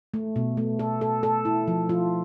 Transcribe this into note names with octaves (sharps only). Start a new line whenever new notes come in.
A3
B2
A3
A4
A4
A4
E4
F3
F4